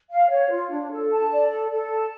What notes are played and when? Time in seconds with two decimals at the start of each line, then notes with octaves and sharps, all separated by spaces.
0.10 F5
0.30 C#5
0.50 F4
0.71 D4
0.91 A4
1.10 A5
1.30 D5
1.50 A4
1.70 A4
1.90 A5